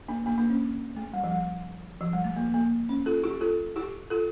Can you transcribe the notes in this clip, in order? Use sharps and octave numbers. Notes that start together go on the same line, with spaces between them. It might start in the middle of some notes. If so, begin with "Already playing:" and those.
A#3 D4
A#3 D4
A#3 D4
C#4
A3
G3
F3
G3
F3
G3
A3
A#3
A#3
C#4
F4 A4
E4 G4
F4 A4
E4 G4
F4 A4